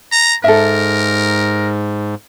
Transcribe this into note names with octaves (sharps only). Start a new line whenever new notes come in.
A#5
G#2 A4 A#4 E5